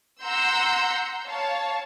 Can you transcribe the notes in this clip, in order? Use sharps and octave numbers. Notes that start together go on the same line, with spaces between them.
F#5 A#5 C6 E6 G6
C#5 F5 A5